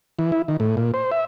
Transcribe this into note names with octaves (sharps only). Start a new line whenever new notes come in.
E3
E4
D#3
A2
A#2
C5
E5